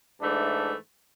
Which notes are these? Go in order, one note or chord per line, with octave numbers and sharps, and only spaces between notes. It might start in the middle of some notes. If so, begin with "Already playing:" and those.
G#2 E3 A3 D4